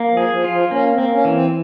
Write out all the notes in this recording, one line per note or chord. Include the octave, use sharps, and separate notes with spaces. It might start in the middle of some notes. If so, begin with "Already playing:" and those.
Already playing: A#3
F3
G#4
F3
F4
F3
A#3 C#4
C4
A#3
C#4
E3
C4